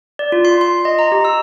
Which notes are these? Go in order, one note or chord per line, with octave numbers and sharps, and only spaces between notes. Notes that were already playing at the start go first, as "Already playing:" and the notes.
D5
F4
C6
C6
D#5
A#5
G4
E6